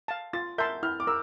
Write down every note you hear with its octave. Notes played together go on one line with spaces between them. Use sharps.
F5 A5
F4 A6
A#4 E5 A5 C6 G6
E4 F6
D6
A#4 E6